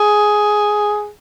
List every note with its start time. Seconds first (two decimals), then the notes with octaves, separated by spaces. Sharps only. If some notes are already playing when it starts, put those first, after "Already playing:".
Already playing: G#4